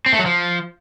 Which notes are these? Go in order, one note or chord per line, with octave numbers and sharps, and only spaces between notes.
C4
A3
F#3
F3